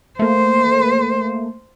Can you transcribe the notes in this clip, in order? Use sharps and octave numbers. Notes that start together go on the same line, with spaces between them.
A3 A#3 C5